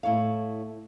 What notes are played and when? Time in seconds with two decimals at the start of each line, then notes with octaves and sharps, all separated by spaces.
0.03 A2 E4 C#5 F5